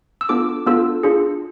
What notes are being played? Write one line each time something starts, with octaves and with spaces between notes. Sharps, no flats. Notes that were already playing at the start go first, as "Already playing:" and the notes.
E6
B3 D4 F4 A4 D6
B3 D4 F4 A4 E6
D4 F4 G#4